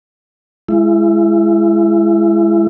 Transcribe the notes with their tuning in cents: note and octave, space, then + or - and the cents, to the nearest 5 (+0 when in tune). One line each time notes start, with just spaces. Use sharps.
G#3 +0 E4 +30